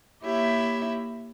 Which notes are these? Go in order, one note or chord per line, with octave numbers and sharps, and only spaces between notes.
A#3 E4 G4 C#5 E5